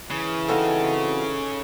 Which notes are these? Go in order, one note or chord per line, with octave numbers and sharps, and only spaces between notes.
C#3 E3
C4 D#4 F#4 A4 F5